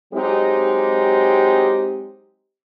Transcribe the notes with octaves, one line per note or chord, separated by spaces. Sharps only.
F#3 G#3 C4 D#4 G4